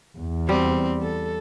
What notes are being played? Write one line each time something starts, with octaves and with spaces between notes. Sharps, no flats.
E2
G3 C4
A4